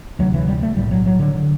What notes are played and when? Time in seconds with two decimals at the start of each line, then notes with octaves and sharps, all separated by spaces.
0.19 D2 C3 F#3
0.34 E3
0.48 G3
0.63 A3
0.76 B1 A2 G3
0.91 F#3
1.06 F#3
1.20 D3
1.35 D3